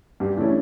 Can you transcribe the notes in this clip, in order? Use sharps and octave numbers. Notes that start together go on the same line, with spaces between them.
G2 G4
E3 A3 C#4 D4 E4